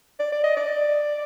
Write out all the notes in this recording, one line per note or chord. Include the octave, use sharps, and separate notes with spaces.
D5
D5
D#5
D5